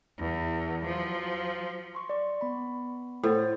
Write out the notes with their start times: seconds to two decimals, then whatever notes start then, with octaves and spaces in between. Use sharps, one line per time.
0.19 E2
0.86 F3 F#3
1.95 C6 C#6
2.10 D5 C#6
2.41 B3 B5
3.23 A2 C5 F#5 A6